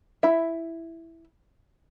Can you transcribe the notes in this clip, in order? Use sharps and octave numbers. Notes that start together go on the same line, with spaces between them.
E4 E5